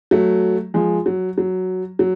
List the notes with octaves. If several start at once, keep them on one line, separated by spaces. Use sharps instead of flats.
F#3 A3
F3 G#3
F#3
F#3
F#3